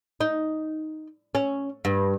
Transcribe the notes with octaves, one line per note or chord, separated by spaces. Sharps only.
D#4
C#4
G2